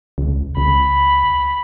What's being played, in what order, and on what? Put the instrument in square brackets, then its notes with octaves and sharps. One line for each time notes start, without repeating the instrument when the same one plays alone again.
[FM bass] C#2
[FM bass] C#2 [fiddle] B5